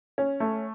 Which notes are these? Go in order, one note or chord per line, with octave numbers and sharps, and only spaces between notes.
C#4
A3